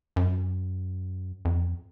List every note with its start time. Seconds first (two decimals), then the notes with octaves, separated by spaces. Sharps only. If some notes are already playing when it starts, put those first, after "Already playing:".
0.16 F#2
1.45 F2